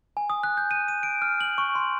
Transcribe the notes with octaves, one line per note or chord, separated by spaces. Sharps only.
G#5
D#6
F#6
G6
D#7
D#7
D7
F6
F#7
C#6
C6